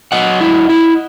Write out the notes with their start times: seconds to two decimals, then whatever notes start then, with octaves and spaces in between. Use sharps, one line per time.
0.12 F#3 D#5 F#5
0.41 E4
0.69 E4